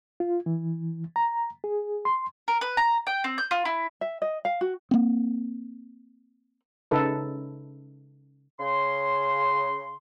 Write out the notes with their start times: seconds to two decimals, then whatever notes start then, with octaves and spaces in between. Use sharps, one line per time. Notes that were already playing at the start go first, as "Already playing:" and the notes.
0.20 F4
0.46 E3
1.16 A#5
1.64 G#4
2.05 C6
2.48 A#4
2.61 B4
2.77 A#5
3.07 G5
3.24 C4
3.38 G6
3.51 F4
3.65 E4
4.01 E5
4.22 D#5
4.45 F5
4.61 F#4
4.91 A#3 C4
6.91 C#3 D#4 A4 B4
8.60 C#3 C6